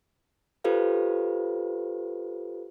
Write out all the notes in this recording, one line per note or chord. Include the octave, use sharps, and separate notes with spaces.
F4 G4 A4 B4 C5 F5